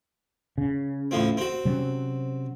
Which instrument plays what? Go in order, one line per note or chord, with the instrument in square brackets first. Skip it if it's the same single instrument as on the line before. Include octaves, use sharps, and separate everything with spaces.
[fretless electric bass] C#3
[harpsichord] A2 F3 C4
C4 F#4
[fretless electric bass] C3 F#3 C#4